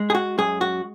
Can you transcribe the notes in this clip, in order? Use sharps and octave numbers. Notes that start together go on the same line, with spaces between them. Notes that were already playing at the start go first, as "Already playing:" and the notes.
Already playing: G#3
G#4
F#4
F#2 G#4
F#4